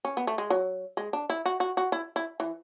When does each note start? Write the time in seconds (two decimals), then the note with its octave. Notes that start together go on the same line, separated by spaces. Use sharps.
0.05 C#4
0.17 B3
0.27 A3
0.38 G#3
0.50 F#3
0.97 G#3
1.13 D4
1.30 E4
1.46 F#4
1.60 F#4
1.77 F#4
1.92 E4
2.16 E4
2.40 E3